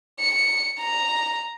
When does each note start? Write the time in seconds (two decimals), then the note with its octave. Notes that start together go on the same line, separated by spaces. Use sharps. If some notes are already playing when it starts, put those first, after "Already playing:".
0.19 C#7
0.80 A#5